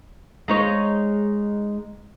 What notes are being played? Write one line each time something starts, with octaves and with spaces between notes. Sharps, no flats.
G#3 D#4 C#5